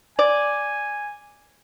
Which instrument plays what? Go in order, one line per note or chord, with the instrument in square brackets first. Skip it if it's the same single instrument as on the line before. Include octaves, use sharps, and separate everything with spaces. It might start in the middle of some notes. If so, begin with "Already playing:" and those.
[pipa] D5 [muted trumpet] G#5